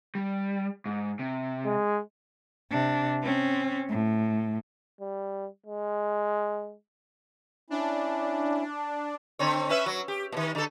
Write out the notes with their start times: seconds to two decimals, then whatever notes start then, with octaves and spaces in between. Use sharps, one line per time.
0.15 G3
0.86 G#2
1.19 C3
1.65 G#3
2.71 C3 D4
3.22 C4 C#4
3.89 A2
5.01 G3
5.66 G#3
7.70 C#4 D4 E4
9.39 D3 C4 C#5
9.69 C#4 B4 E5
9.86 F#3
10.08 G4
10.32 A#2 D#3
10.55 D3 A4